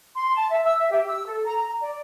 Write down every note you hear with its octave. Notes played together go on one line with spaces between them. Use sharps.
C6
A5
E5
E6
E5
G4
E6
A4
A#5
A#5
D5